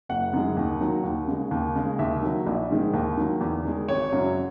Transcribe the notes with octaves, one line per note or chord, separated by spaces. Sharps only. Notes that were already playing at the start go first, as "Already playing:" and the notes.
F#1 F#5
F#2 D#3 G#3
D#2
D#3 F#3
D#2
C#3 G#3
D#2
C#3 G#3
D#2 E5
D#3 F#3
A#1
G#2 D#3 G#3
D#2
D#3 F#3
E2
D#3 G#3
G#1 C#5
F#2 C#3 F#3